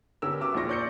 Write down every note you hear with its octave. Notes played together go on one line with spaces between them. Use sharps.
D3 B3 C#4 G4 A#4 E6
F#4 B4 E5 D6 E6
A#1 A#3 F4 C5 C#6 A#6
D5 G6 C#7